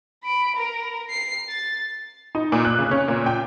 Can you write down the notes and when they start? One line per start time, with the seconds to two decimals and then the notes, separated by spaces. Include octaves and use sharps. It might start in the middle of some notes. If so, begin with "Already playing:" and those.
0.23 B5 D7
0.56 A#4
1.10 C7
1.49 A6
2.35 D#4
2.52 A#2
2.65 F#6
2.79 C#3
2.91 C#4
3.08 A#2
3.26 G5